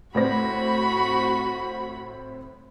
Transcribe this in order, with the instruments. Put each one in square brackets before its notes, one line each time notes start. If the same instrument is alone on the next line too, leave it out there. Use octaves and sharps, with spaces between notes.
[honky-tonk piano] A2 C4 A#6 [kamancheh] F#4 B5